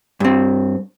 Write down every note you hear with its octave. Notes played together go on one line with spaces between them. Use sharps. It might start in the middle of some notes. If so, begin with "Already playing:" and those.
G2 C4